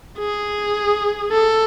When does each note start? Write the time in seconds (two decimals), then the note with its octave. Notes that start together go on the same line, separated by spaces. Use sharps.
0.18 G#4
1.31 A4